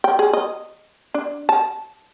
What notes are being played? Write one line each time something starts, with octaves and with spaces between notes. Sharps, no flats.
G5
G#4
D#5
D4
A5